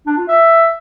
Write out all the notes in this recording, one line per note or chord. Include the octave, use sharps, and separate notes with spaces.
D4
F4
E5